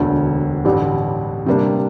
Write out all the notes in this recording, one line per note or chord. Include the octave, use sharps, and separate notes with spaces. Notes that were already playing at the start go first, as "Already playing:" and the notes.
Already playing: E1 D2 D3
A1 G2 D3 G3 D4
C3 G3 A#3 D4